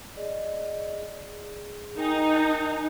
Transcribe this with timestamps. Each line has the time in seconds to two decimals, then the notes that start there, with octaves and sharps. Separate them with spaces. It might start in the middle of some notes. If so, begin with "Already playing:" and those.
0.17 G#4 D5 D#5
0.94 G#4
1.97 D#4 A#4 G5 G#5